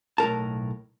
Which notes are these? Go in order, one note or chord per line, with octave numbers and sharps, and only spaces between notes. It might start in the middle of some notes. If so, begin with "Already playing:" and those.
B1 A2 A#4 A5